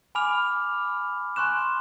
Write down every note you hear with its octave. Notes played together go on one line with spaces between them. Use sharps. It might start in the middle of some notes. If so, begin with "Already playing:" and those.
G#5 B5 D6 F6 F7
G#5 C6 C#6 F#6 E7